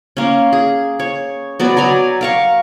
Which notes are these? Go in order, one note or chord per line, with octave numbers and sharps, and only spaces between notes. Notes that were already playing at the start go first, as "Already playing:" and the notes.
A#3 C#4
G#4
C#5
F#3 B3 D5
F#3 D5 G#5 A#5
A#4 F5 C#6